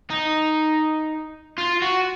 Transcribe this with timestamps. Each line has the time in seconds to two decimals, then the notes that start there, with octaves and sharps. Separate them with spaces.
0.10 D#4
1.58 F4
1.82 F#4